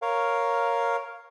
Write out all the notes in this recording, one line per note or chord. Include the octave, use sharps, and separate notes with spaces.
A#4 C#5 F5